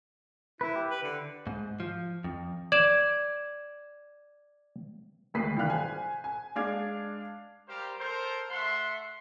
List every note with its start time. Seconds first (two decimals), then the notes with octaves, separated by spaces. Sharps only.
0.61 E4 B4
0.76 G4
0.90 B4
1.03 D3
1.47 G#2
1.80 F3
2.24 F2
2.72 D5 G#6 E7
5.34 G#1 D2 B4 B6 C7
5.57 C2 D#3 E3 D5 F5 F#6
5.70 C5 G#5
6.24 G#5
6.56 G#3 D4 F5 D6 G#6
7.68 G3 G4 A#4 C5 F5
7.99 A4 A#4 C5
8.50 A3 E5 F#5 C6